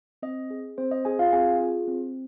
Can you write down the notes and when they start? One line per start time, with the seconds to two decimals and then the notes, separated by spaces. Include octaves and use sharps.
0.22 C4 D#5
0.51 G#4
0.78 C4 C5
0.91 D#5
1.05 G#4 G#5
1.19 F4 F5
1.33 C4 G#4 G#5
1.60 F4 G#4
1.87 C4